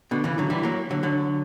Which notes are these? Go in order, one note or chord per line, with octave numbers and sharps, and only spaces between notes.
B2 D3
C#3 E3
D3 F#3
E3 G3
F#3 A#3
D3 F#3
D3 F#3